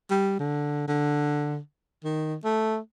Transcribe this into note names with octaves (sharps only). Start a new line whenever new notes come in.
G3
D3
D3
D#3
A3